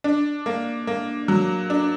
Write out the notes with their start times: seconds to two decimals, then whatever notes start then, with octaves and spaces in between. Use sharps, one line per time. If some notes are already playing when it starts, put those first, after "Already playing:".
0.04 D4
0.46 A#3
0.87 A#3
1.28 F#3
1.70 D4